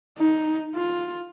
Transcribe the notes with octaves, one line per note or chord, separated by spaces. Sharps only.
D#4
F4